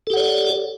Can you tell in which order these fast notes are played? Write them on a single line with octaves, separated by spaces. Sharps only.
A4 G4 F#5 C#5 D5